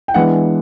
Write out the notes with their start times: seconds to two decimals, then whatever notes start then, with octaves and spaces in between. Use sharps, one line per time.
0.08 G5
0.14 E3 G#3 B3 D4 F#5